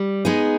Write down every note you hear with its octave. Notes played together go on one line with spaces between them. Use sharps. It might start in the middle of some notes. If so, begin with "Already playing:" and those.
Already playing: G3
G#3 B3 D#4 G#4